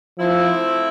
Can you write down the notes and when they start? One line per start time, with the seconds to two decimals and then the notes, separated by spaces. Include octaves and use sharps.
0.19 F3 A3 C4 E4